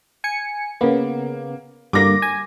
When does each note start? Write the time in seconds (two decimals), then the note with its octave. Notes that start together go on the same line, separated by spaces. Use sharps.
0.24 G#5 C#7
0.81 C#3 A#3 B3
1.93 G2 D3 A#3 D6 A#6
2.22 G#5